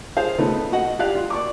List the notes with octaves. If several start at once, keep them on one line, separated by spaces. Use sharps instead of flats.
G#4 C5 F5
C#3 A3 B3 D#4
F#4 D#5 F#5
G4 D5 F5 F#6
F4
D5 C#6 D6